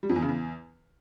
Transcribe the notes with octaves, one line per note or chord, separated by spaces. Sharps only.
G3
F2
E2
C#3
E2